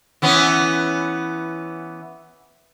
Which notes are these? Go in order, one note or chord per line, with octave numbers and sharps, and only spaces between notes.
E3 B3 C#4